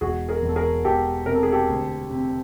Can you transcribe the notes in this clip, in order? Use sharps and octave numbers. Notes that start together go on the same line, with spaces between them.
E1 F#4 G#4
G#4 A#4
E2
A4
G#4 A#4
E1 G4 A4
C3 A#4
A4
G#4
G4 A4
D2
C3